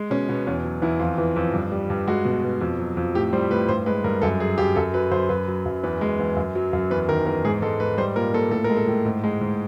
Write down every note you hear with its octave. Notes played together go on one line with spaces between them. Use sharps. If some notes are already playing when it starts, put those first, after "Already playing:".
Already playing: G#3
B2 C#4
B2 B3
E2 C#4
F#3
E2 E4
F2 F4
E3
F2
G2
G3
G2
G#3 F#4
B2
B2
F2
F#3
F2
A2 G4
G3 C5
A2 B4
G2 C5
G#3 B4
G2 A#4
F#2 A4
F#3 G#4
F#2 G4
F#2 A4
F#3 B4
F#2 C5
F#2 B4
F#3
F#2
E2 B4
G#3
E2
F#2
F#3
F#2
E2 B4
D#3 A#4
E2 A#4
G#2 G#4
G#3 A4
G#2 B4
G3 C5
A#2 A#4
A#2 A4
A2 A4
A#4
G#3
A4
A2
G#2
G#3
G#2